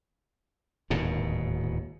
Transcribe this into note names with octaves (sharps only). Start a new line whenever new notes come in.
D1 D#2 G#2 B2